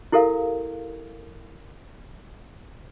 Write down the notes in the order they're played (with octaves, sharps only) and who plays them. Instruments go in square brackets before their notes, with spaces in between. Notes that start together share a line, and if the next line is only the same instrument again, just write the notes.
[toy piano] E4 G4 A4 A#4 F5